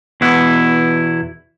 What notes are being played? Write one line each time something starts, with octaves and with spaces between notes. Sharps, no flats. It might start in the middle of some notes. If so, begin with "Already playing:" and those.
E2 B2 E4 F#5